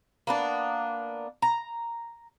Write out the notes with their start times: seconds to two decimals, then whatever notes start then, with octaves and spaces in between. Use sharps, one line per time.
0.27 A#3 B3 D4
1.42 A#5